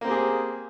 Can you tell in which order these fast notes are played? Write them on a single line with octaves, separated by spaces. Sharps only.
A#3 C4 G4 G#4